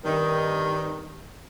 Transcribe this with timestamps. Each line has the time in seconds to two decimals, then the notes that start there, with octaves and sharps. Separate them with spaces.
0.05 G2 C3 D#3